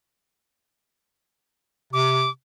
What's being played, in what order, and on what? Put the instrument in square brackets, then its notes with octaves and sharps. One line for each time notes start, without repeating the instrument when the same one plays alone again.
[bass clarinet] C3 [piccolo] D6